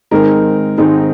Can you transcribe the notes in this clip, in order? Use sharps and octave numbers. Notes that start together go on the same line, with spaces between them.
G#2 D#3 G#3 C4 D#4 A#4
G#2 D#3 G#3 C4 D#4